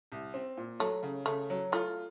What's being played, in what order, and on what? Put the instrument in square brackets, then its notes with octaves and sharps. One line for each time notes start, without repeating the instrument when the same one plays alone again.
[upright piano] C2
C4
A#2
[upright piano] F#3 [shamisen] A3
[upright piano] C#3
[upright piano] C#3 [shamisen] A3
[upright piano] F#3
[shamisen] A3 [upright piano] F4